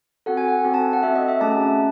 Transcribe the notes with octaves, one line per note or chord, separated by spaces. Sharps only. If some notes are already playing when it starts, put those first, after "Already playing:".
C4 F#4 A4 F#5
G#5
F#5
C4 F#4 A4
A5
F#5
C4 F#4 A4 E5
D#5
E5
A3 C#4 G#4 A5